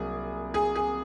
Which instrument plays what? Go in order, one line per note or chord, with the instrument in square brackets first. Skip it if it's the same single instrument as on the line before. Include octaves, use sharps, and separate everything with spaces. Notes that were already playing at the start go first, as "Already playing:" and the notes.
Already playing: [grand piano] C2 F#3 A#3 [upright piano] G#4
[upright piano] G#4
G#4